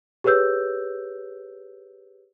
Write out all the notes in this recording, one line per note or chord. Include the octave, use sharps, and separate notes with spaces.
G4 G#4 B4 C#5 E6 G6